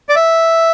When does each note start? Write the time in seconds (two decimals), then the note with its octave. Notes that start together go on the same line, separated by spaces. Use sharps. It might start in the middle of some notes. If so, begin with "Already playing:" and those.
0.09 D5
0.16 E5